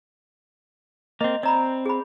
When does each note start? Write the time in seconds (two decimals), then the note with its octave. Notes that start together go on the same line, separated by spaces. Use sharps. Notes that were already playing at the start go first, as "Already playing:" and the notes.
1.21 A#3 C4 D#5
1.43 C4 D5 A#5 B5
1.86 G#4 B5